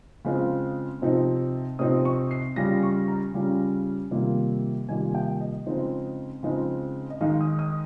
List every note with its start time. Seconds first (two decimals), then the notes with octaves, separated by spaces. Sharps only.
0.25 C#3 G#3 C4 F4
1.02 C3 F3 C4 D#4
1.79 C3 F3 C4 D#4 D#6
2.05 C#6
2.31 C7
2.56 C#3 G3 C#4 F4 A#6
2.83 C#6
3.08 A#5
3.34 C#3 G3 C#4 F4
4.11 C3 D#3 G3 A#3 F4
4.89 C3 D#3 G3 A#3 F4 G#5
5.15 G5
5.40 D#5
5.66 C#3 F3 G#3 C4 D#4
6.43 C#3 F3 G#3 C4 D#4
7.10 D#5
7.21 D#3 G#3 D#4 F5
7.41 D#6
7.59 D#6